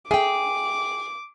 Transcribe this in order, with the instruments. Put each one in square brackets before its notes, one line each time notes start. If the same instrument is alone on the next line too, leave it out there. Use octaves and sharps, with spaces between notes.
[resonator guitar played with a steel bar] G#4 [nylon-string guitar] E5 G5 [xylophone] G#5 [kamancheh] D6